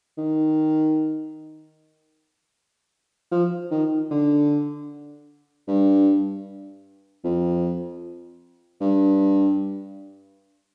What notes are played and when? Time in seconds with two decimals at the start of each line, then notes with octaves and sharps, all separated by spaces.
0.18 D#3
3.31 F3
3.71 D#3
4.11 D3
5.68 G2
7.24 F2
8.81 G2